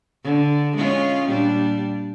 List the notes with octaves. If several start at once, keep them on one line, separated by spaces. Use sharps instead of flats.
D3
G#3 C#4 F4
A#2 G3 D4